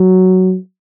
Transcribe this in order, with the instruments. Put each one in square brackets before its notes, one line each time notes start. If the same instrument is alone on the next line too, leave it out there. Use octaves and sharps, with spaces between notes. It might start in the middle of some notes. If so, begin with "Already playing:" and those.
Already playing: [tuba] F#3